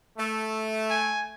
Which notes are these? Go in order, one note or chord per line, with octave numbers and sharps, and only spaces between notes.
A3
G#5